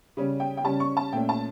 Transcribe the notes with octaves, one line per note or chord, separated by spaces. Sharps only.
C#3 G3 C#4
G5
G5
C#3 G3 C#4 A5
C#6
A5
A#2 A3 C#4 G5
A5